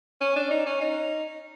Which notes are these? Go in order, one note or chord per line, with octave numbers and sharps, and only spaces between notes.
C#4
D4
D#4
C#4
D#4